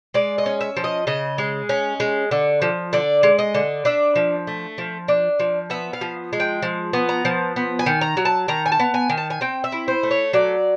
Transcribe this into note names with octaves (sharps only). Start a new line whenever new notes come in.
G#3 D5
D#5
C#4
E5
F3
D#5
C#3 D#5
G#3
C#4
G#3
D3
F3
D3 D5
G#3
D#5
D3
D4 E5
F3
A3
F3
D4
F3
B3 E5
F5
F3
G#3
G5
F3
B3
A#5
F3
B3
G#5
D#3
A#5
F#3
A5
D#3 A#5
G#5
A5
B3
G#5
D#3
A5
G#5
C4 G5
E5
E4
C5
A3
C#5
F#3 D5